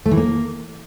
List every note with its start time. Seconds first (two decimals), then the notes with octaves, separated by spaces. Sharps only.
0.06 A3
0.11 E3
0.17 A#3